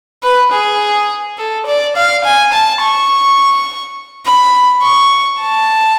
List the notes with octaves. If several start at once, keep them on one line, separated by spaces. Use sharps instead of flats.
B4
G#4
A4
D5
F5
G#5
A5
C#6
B5
C#6
A5